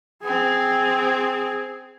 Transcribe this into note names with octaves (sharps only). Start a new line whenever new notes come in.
C4 G#4